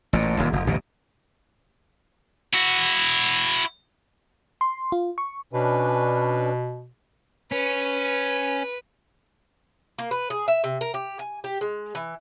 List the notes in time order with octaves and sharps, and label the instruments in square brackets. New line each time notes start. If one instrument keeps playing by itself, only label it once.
[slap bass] A1 A#2
D#1 D#2
F1
A1 D2 G2 B2
[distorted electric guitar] E4 F#4
[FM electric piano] C6
F4
C#6
[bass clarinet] B2 [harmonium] C#4 D4 B4
[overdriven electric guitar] C#4 [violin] B4
[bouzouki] A#3
B4
G#4
E5
C3
A#4
G4
G#5
G4
G#3
E3